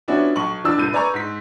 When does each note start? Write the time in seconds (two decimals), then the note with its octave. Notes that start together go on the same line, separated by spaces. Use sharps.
0.08 F3 B3 C#4 D4 E4 F#4
0.36 B1 C#6 F#7
0.64 E2 D4 E6
0.78 C2 A2 G6 D#7
0.93 B4 D5 G#5 A#5 C#6
1.13 G#2 B6